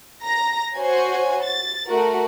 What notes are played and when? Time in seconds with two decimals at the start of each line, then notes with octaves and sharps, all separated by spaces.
0.22 A#5 A#6
0.76 F#4 C5 C#5 G#5
1.44 A6
1.86 A3 F#4 A#4